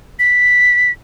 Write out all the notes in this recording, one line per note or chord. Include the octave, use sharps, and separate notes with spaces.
B6